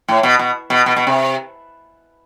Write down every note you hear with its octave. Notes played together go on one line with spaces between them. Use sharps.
A2
B2
B2
B2
B2
B2
C3